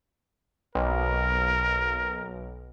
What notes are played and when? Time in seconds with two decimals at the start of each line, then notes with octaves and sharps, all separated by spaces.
0.75 B1 A#4